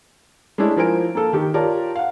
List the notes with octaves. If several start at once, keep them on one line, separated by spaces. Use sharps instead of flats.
G#3 A3 C#4 D4 E4
F3 E4 A#4 C5 G#5 D7
A#3 A4
D#3 G4
F4 G4 A#4 C#5 D5 A5
F5 F#5